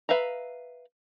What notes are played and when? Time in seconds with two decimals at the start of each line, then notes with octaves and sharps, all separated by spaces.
0.09 B4 E5 F5 A#5